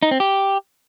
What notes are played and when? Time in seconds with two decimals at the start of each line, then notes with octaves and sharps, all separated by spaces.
0.02 D#4
0.11 C4
0.20 G4